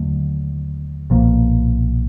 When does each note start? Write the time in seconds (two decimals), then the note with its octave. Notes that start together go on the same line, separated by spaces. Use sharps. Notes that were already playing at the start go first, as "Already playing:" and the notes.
Already playing: D#2 D3 F#3 A3
1.10 B1 A#2 F3 A#3